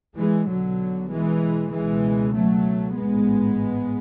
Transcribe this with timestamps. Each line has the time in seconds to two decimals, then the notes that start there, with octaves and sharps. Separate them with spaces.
0.17 E3 G#3
0.48 B1 B2 D3 F#3
1.11 E3 G#3
1.73 C#2 B2 E3 G#3
2.34 F#3 A3
2.96 A1 G#2 G#3 B3